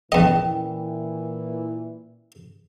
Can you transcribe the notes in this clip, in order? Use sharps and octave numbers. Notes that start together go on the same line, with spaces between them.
E2 A#2 E3 C#4 E4 D#5 G5